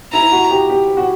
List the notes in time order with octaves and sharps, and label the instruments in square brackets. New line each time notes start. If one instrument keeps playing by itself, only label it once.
[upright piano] E4 [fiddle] A#5
[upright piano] F#4
G4
G4
F#4